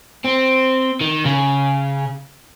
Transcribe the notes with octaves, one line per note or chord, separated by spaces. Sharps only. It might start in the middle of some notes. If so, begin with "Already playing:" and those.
C4
D#3
C#3